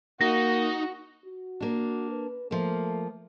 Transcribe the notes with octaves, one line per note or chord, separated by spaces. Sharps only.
A#3 D#4 F#4 A#6
F#4
A#3 D4
B4
F3 A3 A#3